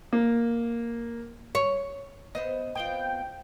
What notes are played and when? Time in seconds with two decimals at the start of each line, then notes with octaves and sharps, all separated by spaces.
0.13 A#3
1.55 C#5
2.35 B3 C5 D#5 E5
2.75 B3 C4 F4 G5